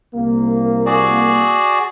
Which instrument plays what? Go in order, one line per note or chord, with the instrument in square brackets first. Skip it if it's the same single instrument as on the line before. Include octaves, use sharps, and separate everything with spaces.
[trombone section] C2 A#3
[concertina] F#4 G#4 D5